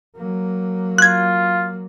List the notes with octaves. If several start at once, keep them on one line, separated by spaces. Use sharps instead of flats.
F#3 A#3
F4 F#6 G#6